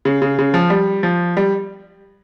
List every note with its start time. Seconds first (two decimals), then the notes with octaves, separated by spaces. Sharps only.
0.05 C#3
0.22 C#3
0.39 C#3
0.54 F3
0.70 G3
1.03 F3
1.37 G3